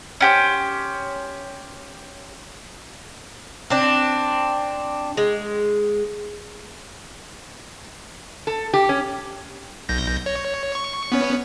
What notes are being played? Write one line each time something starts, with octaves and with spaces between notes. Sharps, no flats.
C#4 G4 C5
C4 D4
G#3
A4
G4
C#4
B1 G6 A#6
C#5
C#6
B3 C#4 C#5